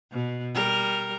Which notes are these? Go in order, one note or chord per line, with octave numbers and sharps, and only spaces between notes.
B2
G3 A#4